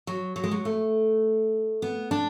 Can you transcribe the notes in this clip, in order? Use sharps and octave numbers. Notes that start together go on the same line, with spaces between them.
F#3
F#3
G#3
F#3
A3
B3
D4